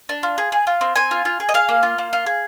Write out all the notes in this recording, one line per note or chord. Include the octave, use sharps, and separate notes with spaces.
D4
F4
G#4
G#4
F4
C4
C4 G#5
F4
F4
G#4
D#5
G#4 F5
A#3
F4
A#3
F4
G#4